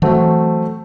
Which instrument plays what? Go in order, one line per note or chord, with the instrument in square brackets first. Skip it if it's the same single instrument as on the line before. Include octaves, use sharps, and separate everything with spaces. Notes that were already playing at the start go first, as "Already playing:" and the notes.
[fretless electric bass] E3 [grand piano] F#3 A3 C4 F#4